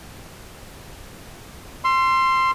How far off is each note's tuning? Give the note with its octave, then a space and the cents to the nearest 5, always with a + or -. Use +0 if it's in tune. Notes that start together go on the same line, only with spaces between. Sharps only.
C6 +5 E6 +40